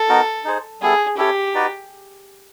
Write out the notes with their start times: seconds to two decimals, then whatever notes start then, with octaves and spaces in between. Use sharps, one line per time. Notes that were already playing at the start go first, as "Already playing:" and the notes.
Already playing: A4
0.09 B3 D#4 F#4 A#4
0.45 D#4 G#4 C5
0.81 G3 B3 E4 G#4 A4
1.17 C#4 E4 G4 A4 C#5
1.54 D#4 F#4 B4 D5